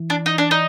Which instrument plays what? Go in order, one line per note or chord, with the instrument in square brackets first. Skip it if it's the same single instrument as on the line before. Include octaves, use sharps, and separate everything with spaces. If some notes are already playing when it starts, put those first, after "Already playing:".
Already playing: [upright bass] E3
[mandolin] D4
D#4
D4
D#4